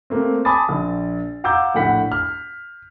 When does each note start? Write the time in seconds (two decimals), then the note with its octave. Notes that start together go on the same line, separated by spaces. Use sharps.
0.10 A3 A#3 C4
0.45 G#5 A5 B5 D6 D#6 A6
0.69 A#1
1.44 F5 F#5 A#5 D6 E6 G6
1.74 A#1 A2 F#5 B6
2.12 F6